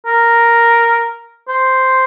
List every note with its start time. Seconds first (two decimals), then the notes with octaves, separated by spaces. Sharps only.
0.06 A#4
1.49 C5